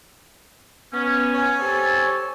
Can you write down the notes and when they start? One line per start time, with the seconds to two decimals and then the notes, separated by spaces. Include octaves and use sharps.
0.93 B3 C#4
1.34 C#5 G#5
1.59 C4 G4 A4